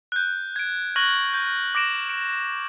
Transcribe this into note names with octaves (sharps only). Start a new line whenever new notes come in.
F#6 G6
G#6 D7
C#6 F6 F#6 G#6 A#6 F#7
G6
D6 A#6 D7 E7
D7